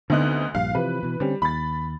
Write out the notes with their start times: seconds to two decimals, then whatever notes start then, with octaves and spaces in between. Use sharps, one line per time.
0.10 D2 D3 B3 C4 D#4 F#6
0.55 A#1 G2 F5
0.75 C3 E3 F3 B4
1.03 B2 E3
1.20 D3 G3 C4 C#4
1.42 D#2 B5 A6